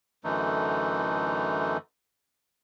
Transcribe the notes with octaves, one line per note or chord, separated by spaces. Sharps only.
F#2 D3 E3 A3 D#4